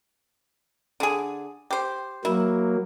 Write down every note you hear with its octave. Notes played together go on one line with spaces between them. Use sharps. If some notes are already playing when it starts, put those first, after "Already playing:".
D3 G#4
G4 C5
F#3 A#3 E4